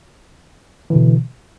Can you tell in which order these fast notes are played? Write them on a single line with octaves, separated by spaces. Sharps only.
E3 D3 B2